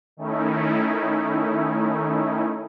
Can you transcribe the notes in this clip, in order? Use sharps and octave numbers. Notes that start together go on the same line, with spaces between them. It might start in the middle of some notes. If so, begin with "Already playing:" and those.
D#3 A3 C#4 D#4 E4